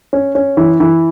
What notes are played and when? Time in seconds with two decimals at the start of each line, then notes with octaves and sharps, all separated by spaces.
0.13 C#4
0.35 C#4
0.57 E3
0.80 E3